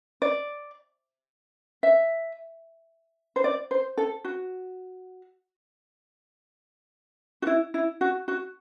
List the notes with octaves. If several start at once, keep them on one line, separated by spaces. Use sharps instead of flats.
D5
E5
C5
D5
C5
A4
F#4
F#4
E4
E4
F#4
F#4